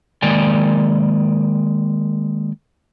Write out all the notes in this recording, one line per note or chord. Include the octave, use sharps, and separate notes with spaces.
D#3 G#3 A#3 D5 G5 G#5